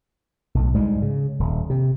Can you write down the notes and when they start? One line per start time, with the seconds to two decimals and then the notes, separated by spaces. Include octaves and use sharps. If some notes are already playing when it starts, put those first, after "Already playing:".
0.55 B1 A2
0.74 D2 G#2 G3 G#3
1.02 C#3
1.39 D#1
1.70 C3